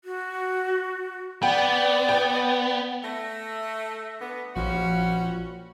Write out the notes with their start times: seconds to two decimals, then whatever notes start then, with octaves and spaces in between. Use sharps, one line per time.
0.04 F#4
1.43 B3 D5 G5
2.09 G5
3.04 A3 A#6
4.21 D3 B3
4.56 A#1 F3 G3 C#4 F#4